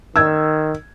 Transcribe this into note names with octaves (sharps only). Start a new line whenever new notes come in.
D#3 E6 G#6